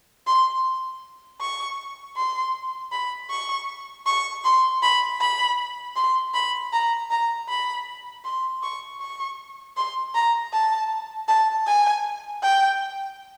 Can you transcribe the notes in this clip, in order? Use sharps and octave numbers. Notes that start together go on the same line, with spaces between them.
C6
C#6
C6
B5
C#6
C#6
C6
B5
B5
C6
B5
A#5
A#5
B5
C6
C#6
C#6
C6
A#5
A5
A5
G#5
G5